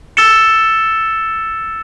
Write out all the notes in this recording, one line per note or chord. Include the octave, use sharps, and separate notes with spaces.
E6 A6 C#7 E7 G7